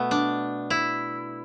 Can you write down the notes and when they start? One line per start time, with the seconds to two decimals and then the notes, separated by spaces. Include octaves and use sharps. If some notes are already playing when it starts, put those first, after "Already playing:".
Already playing: B2 A3 B3
0.11 D4
0.70 E4